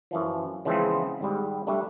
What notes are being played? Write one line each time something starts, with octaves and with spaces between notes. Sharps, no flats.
F#2 E3 F3
C#3 E3 F3 G#3 B3 C4
G#1 G#2 G3
G3 A3 D4